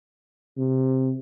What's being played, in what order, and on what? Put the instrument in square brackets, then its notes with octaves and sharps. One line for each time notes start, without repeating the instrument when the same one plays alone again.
[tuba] C3